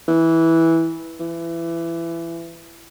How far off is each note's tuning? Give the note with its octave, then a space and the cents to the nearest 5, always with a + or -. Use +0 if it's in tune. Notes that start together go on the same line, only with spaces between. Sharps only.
E3 -10
E3 +25